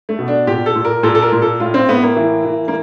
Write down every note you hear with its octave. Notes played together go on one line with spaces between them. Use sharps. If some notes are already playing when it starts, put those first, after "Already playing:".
A3
B2
D4
A#2 G4
A4
A#2
A#4
A#2 A4
A4
A#4
A#2
A4
A2 F4
C4
A2 B3
A#3
E3
E3
A#3